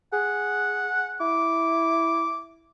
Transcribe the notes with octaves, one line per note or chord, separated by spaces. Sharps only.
G#4 F#5
E4 D6